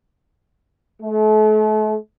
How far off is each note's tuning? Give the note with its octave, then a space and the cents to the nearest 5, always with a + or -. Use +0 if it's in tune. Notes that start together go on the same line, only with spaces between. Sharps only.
A3 -40